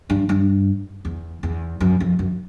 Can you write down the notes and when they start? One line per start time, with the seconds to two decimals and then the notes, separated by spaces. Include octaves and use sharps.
0.10 G2
0.29 G2
1.05 E2
1.43 E2
1.80 F#2
2.00 F2
2.19 F#2